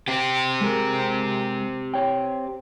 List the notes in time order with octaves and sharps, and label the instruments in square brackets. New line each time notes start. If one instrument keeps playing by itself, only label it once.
[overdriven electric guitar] C4 G4
[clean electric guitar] G#3 A#4
C#5 G5